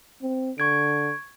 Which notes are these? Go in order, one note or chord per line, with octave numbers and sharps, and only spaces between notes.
C4
D3 C#6 G#6 D7